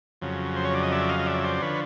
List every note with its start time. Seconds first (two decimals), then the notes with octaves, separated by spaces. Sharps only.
0.21 F2 C#3 F#3
0.56 C5
0.65 C#5
0.74 D5
0.83 D#5
0.92 D5 E5
1.09 D#5 F5
1.19 D#5
1.26 D5 E5
1.44 C5 D5
1.61 D3 F3 B4 C#5